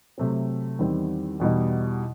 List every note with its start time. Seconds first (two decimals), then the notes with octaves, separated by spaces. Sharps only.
0.18 C3 F#3 A3 C4
0.79 E2 D#3 G3 C4
1.40 E2 B2 G3 D#4